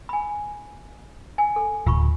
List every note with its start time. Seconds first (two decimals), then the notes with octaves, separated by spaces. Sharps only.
0.09 G#5 B5
1.38 G#5
1.56 A4
1.86 D1 F4 B5 C#6